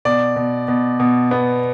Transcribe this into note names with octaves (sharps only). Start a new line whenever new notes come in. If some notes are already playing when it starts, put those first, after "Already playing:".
B2 D5
B2
B2
B2
B3